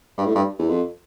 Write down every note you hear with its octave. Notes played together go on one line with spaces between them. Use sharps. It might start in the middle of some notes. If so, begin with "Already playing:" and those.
G2
A2
G2
E2
F2